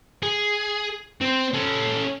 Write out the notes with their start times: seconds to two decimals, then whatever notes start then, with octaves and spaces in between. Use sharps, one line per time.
0.23 G#4
1.21 C4 C5
1.54 C#4 A4